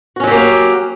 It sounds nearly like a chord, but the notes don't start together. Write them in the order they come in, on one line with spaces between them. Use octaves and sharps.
F#4 C#4 F#3 G4 A#3